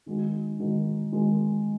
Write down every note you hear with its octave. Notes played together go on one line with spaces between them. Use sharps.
D#3 G#3 D#4 F#4
D#3 G#3 D#4 F#4
D#3 G#3 D#4 F#4